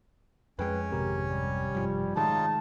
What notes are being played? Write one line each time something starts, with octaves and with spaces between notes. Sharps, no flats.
F2 G#3 C#4 B4 C#5 G5
G#1 C3 G4 A#4
G3
G2 F3
A2 D#3 F#3 G#3 D#4 F4 A5